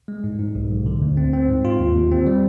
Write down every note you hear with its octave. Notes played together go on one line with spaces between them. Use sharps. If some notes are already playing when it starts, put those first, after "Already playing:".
G#3
G#2
G#2
B1
B1
D3
D2
C4
C4
G#2
F4
D#2
D#2
C4
G3